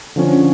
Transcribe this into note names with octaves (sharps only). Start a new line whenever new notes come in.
D3 F3 C#4